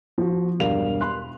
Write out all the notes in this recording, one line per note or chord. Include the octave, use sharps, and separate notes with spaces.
F3 F#4
E1 G2 G3 A#4 F5 F7
B5 C6 F#6